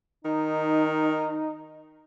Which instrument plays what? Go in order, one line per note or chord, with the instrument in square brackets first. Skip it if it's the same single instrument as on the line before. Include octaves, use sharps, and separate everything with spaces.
[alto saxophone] D#3 [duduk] D#4